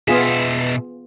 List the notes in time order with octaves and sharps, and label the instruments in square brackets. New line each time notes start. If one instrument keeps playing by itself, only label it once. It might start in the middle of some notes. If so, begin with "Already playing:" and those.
[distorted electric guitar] B2 E5 [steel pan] B3 F4 G#4